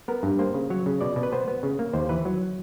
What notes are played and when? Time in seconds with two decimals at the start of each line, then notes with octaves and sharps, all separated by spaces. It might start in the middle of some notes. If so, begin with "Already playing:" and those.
0.08 B3 A#4
0.23 G2
0.39 A#3 C5
0.54 C#3
0.70 F#3 C#5
0.86 C#3
1.01 B2 D5
1.16 B2
1.23 B4
1.33 B3 C5
1.48 B3
1.63 C#3
1.79 A#3
1.93 D#2 C5
2.09 E3 B4
2.25 F#3